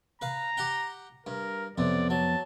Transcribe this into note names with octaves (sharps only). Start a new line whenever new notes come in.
B4 F5 A#5
G4 F#5 G5
G2 A#4
B1 F2 C3 B3 D5
F#3 A5